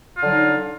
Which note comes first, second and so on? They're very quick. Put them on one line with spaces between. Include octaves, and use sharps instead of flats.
F4 D3 F#3 D#4